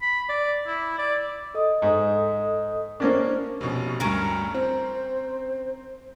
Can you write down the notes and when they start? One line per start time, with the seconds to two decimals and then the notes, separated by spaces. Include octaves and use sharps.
0.02 B5
0.29 D5
0.67 E4
0.98 D5
1.54 A4 D#5 D#6
1.82 G#2
3.00 A#3 C#4 D4 A#4 C5
3.61 F1 B2 C#4
4.00 D2 G2 C#4 A#4
4.54 C4 C5